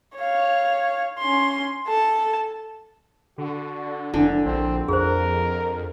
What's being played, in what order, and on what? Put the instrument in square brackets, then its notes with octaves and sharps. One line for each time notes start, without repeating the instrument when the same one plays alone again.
[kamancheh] C#5 F5
C#4 C6
A4 A5
[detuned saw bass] D3 [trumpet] F#4
[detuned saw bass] F1 [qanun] D3 [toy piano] D4 E4
[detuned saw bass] A#1 [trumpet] C4
[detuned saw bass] F2 [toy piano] G#4 C5 [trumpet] A#4